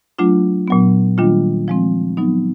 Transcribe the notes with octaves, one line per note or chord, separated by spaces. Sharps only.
F#3 A3 D4 F4
A#2 F#3 B3
D#3 G3 A#3 D4 F4
F3 G#3 C4
F#3 B3 D#4